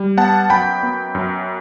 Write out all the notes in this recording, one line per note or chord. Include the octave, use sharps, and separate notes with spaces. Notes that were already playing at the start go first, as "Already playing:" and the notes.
Already playing: G3
B3 F#5 A5
F#2 G5 B5
B3
F#2